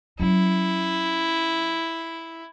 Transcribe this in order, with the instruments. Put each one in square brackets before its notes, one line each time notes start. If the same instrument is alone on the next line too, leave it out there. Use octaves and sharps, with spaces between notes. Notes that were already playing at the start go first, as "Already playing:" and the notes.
[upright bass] F#3 C#4 [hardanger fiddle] E4